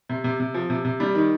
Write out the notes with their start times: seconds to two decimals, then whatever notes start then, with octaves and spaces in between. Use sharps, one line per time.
0.09 C3
0.24 C3
0.40 C3
0.54 F3
0.70 C3
0.85 C3
1.00 G3
1.15 D#3